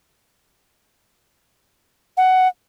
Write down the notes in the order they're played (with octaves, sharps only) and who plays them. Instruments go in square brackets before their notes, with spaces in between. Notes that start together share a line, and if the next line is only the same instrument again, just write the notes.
[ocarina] F#5